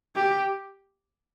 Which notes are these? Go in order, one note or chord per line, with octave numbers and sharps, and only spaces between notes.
G4